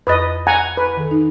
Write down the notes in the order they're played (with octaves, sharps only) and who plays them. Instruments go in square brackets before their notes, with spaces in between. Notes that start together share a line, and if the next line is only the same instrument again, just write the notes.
[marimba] F2 D#6 A6 [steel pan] B4 D#5
[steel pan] F#5 G#5 A#5
B4
[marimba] D#3 A4
D#4